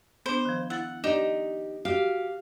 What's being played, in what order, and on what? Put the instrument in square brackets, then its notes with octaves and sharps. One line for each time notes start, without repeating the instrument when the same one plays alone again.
[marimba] B3 D4 [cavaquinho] C5
[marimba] D#3 F3
[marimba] E4 A6 [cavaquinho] F#5
[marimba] D4 D5 [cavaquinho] D#4 [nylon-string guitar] G4
[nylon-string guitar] F#4 G4 [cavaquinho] F5